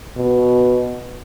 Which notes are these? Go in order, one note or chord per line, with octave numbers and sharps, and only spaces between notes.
B2